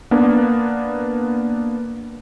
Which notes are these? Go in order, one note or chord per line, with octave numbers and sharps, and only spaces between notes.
A#3 B3 D4